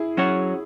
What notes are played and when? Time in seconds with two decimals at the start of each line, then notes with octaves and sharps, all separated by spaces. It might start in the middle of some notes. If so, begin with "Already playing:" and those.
Already playing: E4 G#4
0.17 F#3 C#4 F#4 C#5